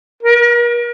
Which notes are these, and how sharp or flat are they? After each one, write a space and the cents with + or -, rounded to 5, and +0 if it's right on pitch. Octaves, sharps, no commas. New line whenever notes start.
A#4 +40